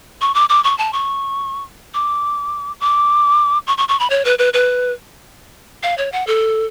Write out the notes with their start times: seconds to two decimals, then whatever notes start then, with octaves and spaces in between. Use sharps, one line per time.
0.21 C#6
0.35 D6
0.49 D6
0.64 C#6
0.78 A5
0.93 C#6
1.94 D6
2.80 D6
3.67 C#6
3.78 C#6
3.89 C#6
4.00 B5
4.10 C#5
4.25 B4
4.39 B4
4.54 B4
5.83 F5
5.98 C#5
6.12 F#5
6.27 A4